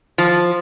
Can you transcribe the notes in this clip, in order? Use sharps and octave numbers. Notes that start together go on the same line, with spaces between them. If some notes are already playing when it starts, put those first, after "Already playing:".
F3